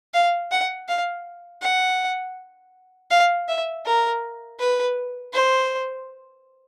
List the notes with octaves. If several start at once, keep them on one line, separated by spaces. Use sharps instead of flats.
F5
F#5
F5
F#5
F5
E5
A#4
B4
C5